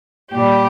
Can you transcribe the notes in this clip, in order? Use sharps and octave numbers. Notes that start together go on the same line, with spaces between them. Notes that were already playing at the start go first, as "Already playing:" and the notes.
A#2 G3 G4